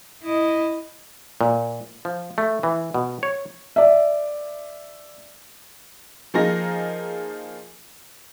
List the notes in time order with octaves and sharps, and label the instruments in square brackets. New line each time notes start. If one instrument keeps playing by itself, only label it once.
[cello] E4 D#5
[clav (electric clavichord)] A#2
F3
A3
E3
B2
C#5
[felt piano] D5 E5
[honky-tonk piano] F3 A#3 D#4 F4 G#4 A#6